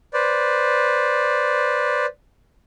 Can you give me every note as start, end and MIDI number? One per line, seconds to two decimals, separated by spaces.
0.14 2.06 71
0.14 2.06 72
0.14 2.06 74